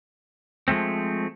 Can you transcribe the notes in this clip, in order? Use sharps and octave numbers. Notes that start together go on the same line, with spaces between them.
F3 G#3 A3 C4